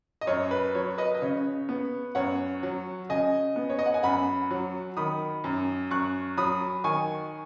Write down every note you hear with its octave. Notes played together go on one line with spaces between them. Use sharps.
D#5
F#2 C#5
B4
F#3 C#5
B4 D#5
D#5
C#3 C#5
B3
F#2 C#5 F#5
F#3
C#3 D#5 G#5
B3
C#5
D#5
F#5
G#5
F#2 F#5 B5
F#3
D#3 B5 D#6
F#2
F#2 C#6 F#6
F#3 B5 D#6
D#3 G#5 C#6